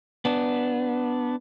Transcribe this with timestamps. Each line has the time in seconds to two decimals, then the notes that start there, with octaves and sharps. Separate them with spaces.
0.25 B3 D4